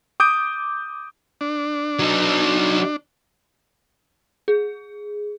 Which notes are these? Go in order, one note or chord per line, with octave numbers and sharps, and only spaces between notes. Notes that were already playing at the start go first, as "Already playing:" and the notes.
D6 D#6 G6 D7
D4
F#3 D#4
G#4